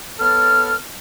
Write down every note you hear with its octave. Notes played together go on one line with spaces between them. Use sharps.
B3 A4 C#5 A5 F6